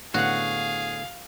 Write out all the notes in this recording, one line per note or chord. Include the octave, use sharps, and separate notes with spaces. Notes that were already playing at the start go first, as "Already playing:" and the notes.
A2 D3 B3 F#4 G#4 F5 F#5